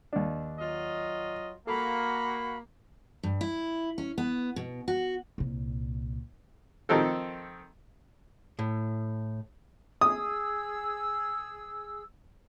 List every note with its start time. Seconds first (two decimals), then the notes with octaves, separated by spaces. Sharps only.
0.13 D#2 D4
0.59 F#3 F4 D#5
1.67 A#3 F#4 A4 B5
3.23 G2
3.41 E4
3.98 C#4
4.18 B3
4.56 B2
4.88 F#4
5.38 C2 A#2
6.89 D#3 F3 C4 A4
8.59 A2
10.01 G#4 D#6 E6